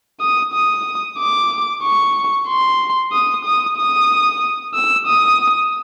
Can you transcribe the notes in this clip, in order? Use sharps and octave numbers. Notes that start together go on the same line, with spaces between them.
D#6
D#6
D6
C#6
C6
D#6
D#6
D#6
E6
D#6